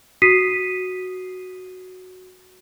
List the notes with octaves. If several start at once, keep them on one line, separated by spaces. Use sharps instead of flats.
F#4 D#6 B6 C7 D#7